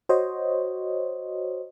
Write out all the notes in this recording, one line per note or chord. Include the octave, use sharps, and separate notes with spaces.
F#4 C5 C#5 D#5